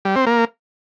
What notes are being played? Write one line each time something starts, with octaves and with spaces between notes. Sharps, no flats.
G3
C4
A#3